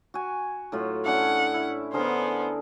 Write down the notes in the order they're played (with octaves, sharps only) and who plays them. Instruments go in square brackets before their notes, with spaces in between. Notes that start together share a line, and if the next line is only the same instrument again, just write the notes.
[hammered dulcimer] F#4 G#5
A2 F#3 F4
[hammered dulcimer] C#4 D4 E4 [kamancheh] F#5
[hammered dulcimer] E4
[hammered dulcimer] D3 G#4 A#4 [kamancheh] B3 C5